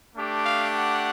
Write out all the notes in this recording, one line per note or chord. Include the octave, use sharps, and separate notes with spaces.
A3 D4 G4
F5
F#5